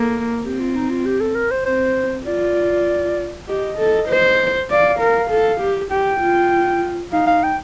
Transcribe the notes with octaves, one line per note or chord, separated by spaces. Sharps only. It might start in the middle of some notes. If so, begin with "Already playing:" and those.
Already playing: A#3 A4
C4 G4
F4
D#4
F4
G4
A4
A#4
C5
C4 C5
F4 D5
G4 D#5
A4
C5
D5 F5
A#4
A4
G4
G4 G5
F4
D#4 F5
F5
G5